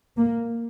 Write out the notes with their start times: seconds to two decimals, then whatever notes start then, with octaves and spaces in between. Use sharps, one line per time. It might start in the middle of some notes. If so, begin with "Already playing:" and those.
0.17 A#3